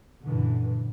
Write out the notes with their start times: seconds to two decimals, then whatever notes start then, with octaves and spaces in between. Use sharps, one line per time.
0.25 F#2 A#2 D3 E3